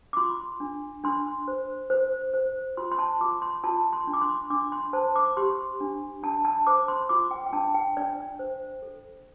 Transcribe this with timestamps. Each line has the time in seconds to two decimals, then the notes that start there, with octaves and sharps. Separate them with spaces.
0.13 D6
0.17 F4 C6
0.60 D4
1.04 D4 C6
1.48 C5
1.90 C5
2.33 C5
2.77 F4 C6
2.92 C6
2.99 A5
3.21 F4 D6
3.42 C6
3.64 F4 A5
3.93 C6
4.07 D4
4.13 D6
4.21 C6
4.50 D4 D6
4.72 C6
4.93 C5 A5
5.16 D6
5.37 G4 C6
5.81 D4
6.23 D4 A5
6.45 A5
6.67 C5 D6
6.88 C6
7.09 F4 D6
7.31 G5
7.46 G5
7.53 D4 A5
7.74 G5
7.97 D4 D5
8.39 C5
8.82 A4